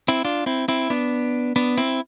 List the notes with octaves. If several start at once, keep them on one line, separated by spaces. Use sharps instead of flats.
C4 E4
D4 F4
C4 E4
C4 E4
B3 D4
B3 D4
C4 E4